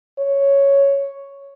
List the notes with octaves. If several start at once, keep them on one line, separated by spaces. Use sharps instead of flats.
C#5